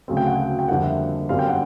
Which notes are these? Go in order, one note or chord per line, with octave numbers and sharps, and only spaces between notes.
D2 C#3 F#3 A3 C4
G5
F#5
G5
G5
F2 D3 G3 A#3 F#5
E5
G1 F#2 D3 G3 C4 F5
G5
F#5